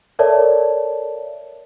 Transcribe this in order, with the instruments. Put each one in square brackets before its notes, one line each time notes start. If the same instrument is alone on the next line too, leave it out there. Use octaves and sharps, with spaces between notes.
[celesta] A4 A#4 C#5 D5 E5 A5